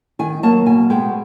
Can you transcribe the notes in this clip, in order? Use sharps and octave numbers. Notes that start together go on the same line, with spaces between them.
D#3 G#5
F#3 A#3 A5
B2 G#5
G#3 B3 G5